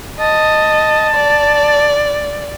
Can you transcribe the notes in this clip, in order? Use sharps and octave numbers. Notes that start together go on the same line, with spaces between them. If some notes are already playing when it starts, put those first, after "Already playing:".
D#5 A5
D5